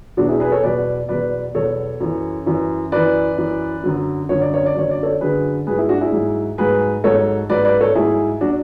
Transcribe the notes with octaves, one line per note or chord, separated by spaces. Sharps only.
E2 B2 F#3 D4 F#4
E4 G#4
G#4 B4
A4 C#5
E2 B2 F#3 B4 D5
E2 B2 F#3 B4 D5
E2 B2 F#3 A4 C#5
F#2 E3
F#2 E3
F#2 E3 B4 D5
F#2 E3
F#2 D3 F#3
F#2 D3 F#3 C#5
D5
C#5
D5
F#2 D3 F#3 C#5
D5
A4 C#5
F#2 D3 F#3 G#4 B4
G#2 F#3 G#4 B4
E4 G#4
D4 F#4
E4 G#4
G#2 F#3
G#2 F#3 G#4 B4
G#2 F#3 A4 C#5
G#2 F#3 B4 D5
B4 D5
A4 C#5
G#2 F#3 E4 G#4
F#3 D4 F#4